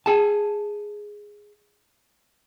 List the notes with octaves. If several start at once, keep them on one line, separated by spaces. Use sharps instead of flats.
G#4 A5